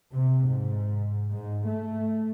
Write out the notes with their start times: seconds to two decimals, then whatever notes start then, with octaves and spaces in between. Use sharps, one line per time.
0.12 C3
0.47 G#2
1.31 G#2
1.68 A3